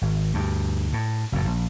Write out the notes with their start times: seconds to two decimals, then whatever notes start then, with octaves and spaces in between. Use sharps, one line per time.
0.02 G#1
0.34 D2 G2
0.93 A2
1.32 F#1 F2 A2
1.45 A#1